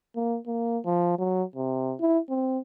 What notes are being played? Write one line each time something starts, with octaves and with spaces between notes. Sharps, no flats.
A#3
A#3
F3
F#3
C3
E4
C4